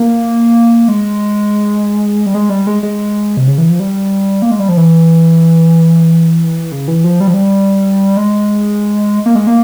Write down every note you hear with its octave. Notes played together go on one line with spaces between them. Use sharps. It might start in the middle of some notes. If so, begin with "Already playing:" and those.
Already playing: A#3
G#3
G3
G#3
G3
G#3
G#3
C3
C#3
E3
F3
G3
A#3
G#3
G3
F3
E3
C#3
E3
F3
G3
F3
G3
G#3
A#3
G#3
A#3